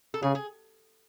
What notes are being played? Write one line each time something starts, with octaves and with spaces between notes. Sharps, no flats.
A4
C#3 G#4
G#4